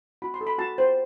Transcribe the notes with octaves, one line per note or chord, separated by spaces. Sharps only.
F#4 B5
C6
A4
B5
F#4 A5
C5